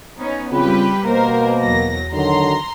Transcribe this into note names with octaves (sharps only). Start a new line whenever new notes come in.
B3 C#4 D#4
C#3 G3 C4 F4 G4 B4
B2 A#3 A#4 C5
E2 F#3 A#6
D3 D#3 F#3 A#5 C6